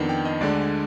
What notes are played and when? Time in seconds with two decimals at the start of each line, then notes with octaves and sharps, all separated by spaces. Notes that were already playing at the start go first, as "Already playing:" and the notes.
Already playing: F2 D#3 B3 D4
0.09 G5
0.25 D#5
0.41 D2 D3 G#3 D4 D5